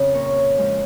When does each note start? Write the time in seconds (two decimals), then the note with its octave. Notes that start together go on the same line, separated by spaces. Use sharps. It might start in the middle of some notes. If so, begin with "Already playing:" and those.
Already playing: F2 C#3
0.14 A#2 A#4 C#5
0.58 F3 G#3